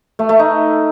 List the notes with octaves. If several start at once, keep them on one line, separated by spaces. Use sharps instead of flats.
A3
A3
D#4